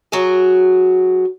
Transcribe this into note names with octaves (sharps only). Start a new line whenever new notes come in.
F#3 F#4 G#4